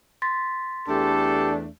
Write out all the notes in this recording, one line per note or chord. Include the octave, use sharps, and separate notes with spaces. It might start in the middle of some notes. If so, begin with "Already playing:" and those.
C6 A6 B6
E2 A3 D4 G4 A4